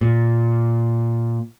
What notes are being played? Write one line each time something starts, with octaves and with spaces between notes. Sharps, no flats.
A#2